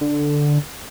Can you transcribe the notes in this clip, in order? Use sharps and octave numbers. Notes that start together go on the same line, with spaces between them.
D3